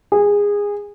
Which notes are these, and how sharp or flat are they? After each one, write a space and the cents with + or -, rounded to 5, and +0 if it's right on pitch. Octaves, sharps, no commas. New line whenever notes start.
G#4 -20